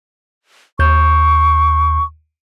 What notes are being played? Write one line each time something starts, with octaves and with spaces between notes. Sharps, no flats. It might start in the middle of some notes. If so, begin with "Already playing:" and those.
D#2 C#6 G6